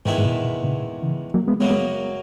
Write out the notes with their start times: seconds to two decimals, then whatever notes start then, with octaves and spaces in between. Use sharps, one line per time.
0.06 E2 G#2 D#3 G#3 B3 E4
0.18 G#2
0.25 B2
0.32 A#2
0.44 B2
0.64 A#2 C#3
1.02 C#3 E3
1.34 F#3 A#3
1.48 G#3 B3
1.60 F#2 C#3 F#3 G#3 A#3 B3
1.70 G#3 B3